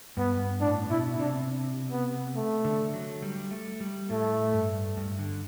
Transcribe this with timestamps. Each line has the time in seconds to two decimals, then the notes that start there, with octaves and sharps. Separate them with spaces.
0.17 G2 B3
0.61 A2 D4
0.90 B2 E4
1.19 C3 D4
1.91 B3
2.36 A3
2.65 D3
2.94 F#3
3.22 G3
3.51 A3
3.80 G3
4.09 A2 A3
4.53 G2
4.97 G2
5.19 D3